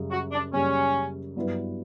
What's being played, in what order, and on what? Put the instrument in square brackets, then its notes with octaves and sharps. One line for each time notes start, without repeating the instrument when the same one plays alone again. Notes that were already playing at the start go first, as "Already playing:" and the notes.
Already playing: [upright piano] F#2 C#3 G3
[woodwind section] F#4
D4
[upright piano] F#2 C#3 G3 [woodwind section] C#4
[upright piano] G2 F#3 B3 E4 B4